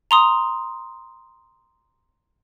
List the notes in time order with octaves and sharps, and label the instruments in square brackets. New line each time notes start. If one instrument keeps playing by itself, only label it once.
[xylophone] A#5 C6 D#6